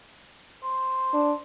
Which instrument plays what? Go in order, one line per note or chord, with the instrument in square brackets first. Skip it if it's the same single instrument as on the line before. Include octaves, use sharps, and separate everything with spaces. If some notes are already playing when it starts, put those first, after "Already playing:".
[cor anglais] C5
[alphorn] D4